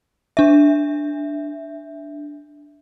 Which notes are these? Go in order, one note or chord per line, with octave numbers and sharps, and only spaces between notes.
D4 E5